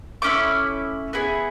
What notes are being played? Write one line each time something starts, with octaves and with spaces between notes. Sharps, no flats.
A3 C#4 E4 D6
B3 E4 G#4